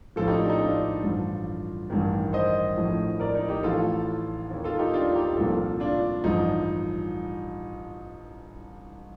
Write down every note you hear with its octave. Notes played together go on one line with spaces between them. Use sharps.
A#1 A2 F3 F4 A4
D#4 G4
D4
D#4
D4 F4
A1 G2 F3
A1 G2 D#3
C5 D#5
A#1 A2 F3
A#4 D5
D#4
D#4 G4
A1 A2 F3 F4 A4
D#2 D#3
F4 A4
D#4 G4
D4 F4
D#4 G4
C2 A#2 F3 F4 A4
D4 F4
A1 G2 F3 D#4